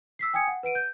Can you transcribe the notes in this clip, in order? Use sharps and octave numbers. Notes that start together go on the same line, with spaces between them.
E6 B6 C7
G5 G#5 D#6 G#6 C#7
F#5
B4 F#5 D7 D#7
G6